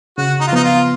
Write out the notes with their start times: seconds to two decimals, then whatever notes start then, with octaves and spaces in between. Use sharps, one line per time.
0.18 C#3 F#4
0.40 D#4
0.47 F4
0.52 F3 B3 D#4
0.64 F4